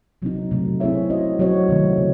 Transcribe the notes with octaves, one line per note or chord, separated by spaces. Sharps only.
C3 F#3 C4 D#4
C3 F#3 A3
C4 E4 G#4 C#5 E5
C#4 F#4 C5 D#5
F#3 C4 F#4 C#5
C3 D#3 A3
C#3